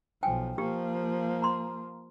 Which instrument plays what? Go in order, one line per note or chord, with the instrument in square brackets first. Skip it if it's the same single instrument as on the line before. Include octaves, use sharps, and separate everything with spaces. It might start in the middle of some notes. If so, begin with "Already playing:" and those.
[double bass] B1 F3 [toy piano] G5 G#5
[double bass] F3 A#3 [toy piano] G4
[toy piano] A#5 C6